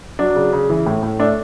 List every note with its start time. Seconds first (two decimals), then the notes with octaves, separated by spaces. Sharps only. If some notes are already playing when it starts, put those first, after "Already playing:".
0.19 F#3 D4
0.35 C#3
0.53 C#3
0.70 E3
0.86 A2
1.03 A2
1.19 A3 D4